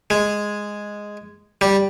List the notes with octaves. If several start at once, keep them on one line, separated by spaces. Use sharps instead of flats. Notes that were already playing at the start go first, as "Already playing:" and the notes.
G#3
G3